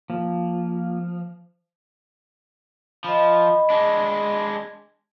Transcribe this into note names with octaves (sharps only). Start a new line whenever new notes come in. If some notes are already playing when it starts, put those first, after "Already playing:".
F3 A#3
F3 D#5 B5
G#3 D4